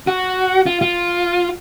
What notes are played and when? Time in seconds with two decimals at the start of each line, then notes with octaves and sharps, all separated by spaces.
0.07 F#4
0.66 F4
0.81 F4